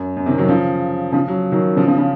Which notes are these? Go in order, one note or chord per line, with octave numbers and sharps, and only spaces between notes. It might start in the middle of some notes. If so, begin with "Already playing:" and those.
Already playing: F#2
F#2
C3 D#3
D#3 F#3
C#3 F3
C#3 F3
F#3
D#3 F#3
C#3 F3
C#3 F3
C#3 F3